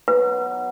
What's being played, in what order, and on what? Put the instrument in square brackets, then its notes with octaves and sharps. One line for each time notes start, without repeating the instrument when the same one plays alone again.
[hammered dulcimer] B2 F#3 B3 D#4 [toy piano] B4